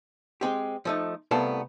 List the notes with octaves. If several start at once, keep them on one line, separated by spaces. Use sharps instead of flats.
G#3 C4 G4
F3 A3 D#4
C2 A3 B3 A#4 F5 A5